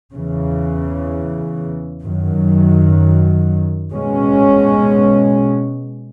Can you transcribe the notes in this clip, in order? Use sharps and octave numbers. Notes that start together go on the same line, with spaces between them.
E2 C#3 E3
F#2 D#3 F#3
B2 G#3 C#4